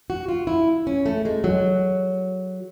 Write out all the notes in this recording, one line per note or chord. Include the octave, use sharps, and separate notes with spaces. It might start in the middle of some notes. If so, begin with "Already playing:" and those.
F#4
F4
E4
C#4
A3
G#3
F#3